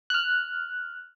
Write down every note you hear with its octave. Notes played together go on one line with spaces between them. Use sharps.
F6 F#6